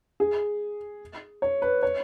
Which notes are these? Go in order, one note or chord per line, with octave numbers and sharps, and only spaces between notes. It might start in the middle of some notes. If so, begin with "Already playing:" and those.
G#4
C#5
B4
C#5